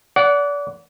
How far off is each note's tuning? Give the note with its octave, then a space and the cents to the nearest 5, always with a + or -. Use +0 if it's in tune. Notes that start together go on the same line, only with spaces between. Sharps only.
D5 -30 F#5 +0